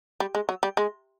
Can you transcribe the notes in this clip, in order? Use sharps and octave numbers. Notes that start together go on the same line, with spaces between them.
G3
G#3
F#3
G3
G#3